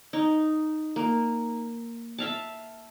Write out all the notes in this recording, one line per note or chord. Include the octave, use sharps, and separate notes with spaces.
D#4
A#3
E5 F5 A5